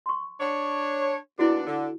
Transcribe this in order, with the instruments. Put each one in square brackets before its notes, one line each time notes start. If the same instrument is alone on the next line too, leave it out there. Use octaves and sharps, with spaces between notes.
[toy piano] C6 C#6
[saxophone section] D4 C#5
[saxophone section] D#2 B3 D4 [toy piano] E4 F#4
[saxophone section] D3